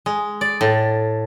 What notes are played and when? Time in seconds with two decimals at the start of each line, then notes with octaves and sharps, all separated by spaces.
0.06 G#3
0.41 D5
0.61 A2